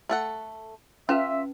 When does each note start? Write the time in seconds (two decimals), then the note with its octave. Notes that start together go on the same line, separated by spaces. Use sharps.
0.09 A3 A4 F#5
1.09 C#4 F4 B4 E5 A5